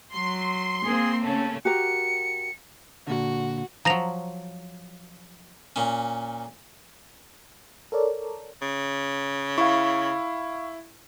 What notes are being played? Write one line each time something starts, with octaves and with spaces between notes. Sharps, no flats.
F#3 C6
A#3 C4 G#4
C#3 A3 C#4 A5
F#4 G4 A#4 C#7
A#2 D3 F#4
F3 F#3 A#5 A#6 F7
A#2 C#4
A4 A#4 C#5 D5
C#3
E4 F5 C#6